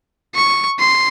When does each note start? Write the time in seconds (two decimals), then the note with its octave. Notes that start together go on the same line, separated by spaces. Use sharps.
0.35 C#6
0.80 C6